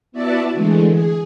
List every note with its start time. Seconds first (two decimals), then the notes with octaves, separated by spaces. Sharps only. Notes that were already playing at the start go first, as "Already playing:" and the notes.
0.12 B3 E4 F#4 D5 E5 A5
0.53 D3 E3 G#3 A3
0.89 G#4